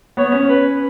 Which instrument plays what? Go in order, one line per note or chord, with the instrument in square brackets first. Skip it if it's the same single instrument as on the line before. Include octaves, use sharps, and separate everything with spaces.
[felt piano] B3 [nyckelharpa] C#5
[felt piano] C#4
[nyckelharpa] B4